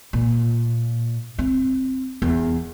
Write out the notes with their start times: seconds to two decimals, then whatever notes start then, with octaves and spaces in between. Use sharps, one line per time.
0.13 A#2
1.39 C4
2.22 E2